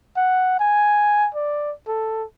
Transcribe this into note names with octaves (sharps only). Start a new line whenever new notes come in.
F#5
G#5
D5
A4